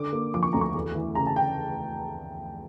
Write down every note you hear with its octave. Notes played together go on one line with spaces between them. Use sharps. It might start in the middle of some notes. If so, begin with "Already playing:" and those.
Already playing: D3 D6
A#3
F3 D6
C#6
D2 A#5
C#6
E2
E3
C#3 A#5
A5
G5